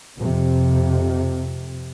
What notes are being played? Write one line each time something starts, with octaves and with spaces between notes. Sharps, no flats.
F2 C3